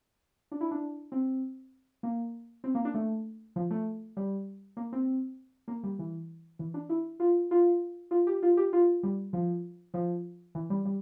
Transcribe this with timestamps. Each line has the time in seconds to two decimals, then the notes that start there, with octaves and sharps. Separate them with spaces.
0.52 D4
0.61 E4
0.71 D4
1.12 C4
2.03 A#3
2.64 C4
2.75 A#3
2.85 D4
2.94 A3
3.56 F3
3.71 A3
4.17 G3
4.77 A#3
4.93 C4
5.68 A#3
5.83 G3
5.99 E3
6.59 E3
6.74 D4
6.89 E4
7.20 F4
7.51 F4
8.11 F4
8.27 G4
8.43 F4
8.57 G4
8.73 F4
9.03 G3
9.33 F3
9.94 F3
10.55 E3
10.70 G3
10.85 G3